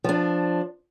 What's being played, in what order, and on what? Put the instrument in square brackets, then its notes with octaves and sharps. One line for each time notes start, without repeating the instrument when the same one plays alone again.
[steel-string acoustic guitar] F3 D4